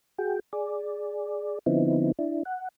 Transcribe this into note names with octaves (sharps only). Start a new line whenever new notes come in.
F#4 G#4 G5
G#4 D5
D3 F3 B3 C4 D#4 E4
D4 E4
F#5